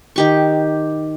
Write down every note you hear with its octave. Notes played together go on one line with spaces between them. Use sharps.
D#3 G4 C#6